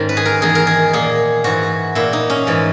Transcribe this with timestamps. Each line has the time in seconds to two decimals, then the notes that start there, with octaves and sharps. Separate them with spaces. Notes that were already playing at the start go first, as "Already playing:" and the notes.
Already playing: G#2 D#3 C#4
0.09 B4
0.17 G#4
0.25 A#4
0.42 E2 D#3 G#4
0.55 A#4
0.67 G#4
0.93 A#2 G#4
1.44 G#2 E3 F#4
1.95 A#2 E4
2.13 D#4
2.30 C#4
2.47 G#2 E3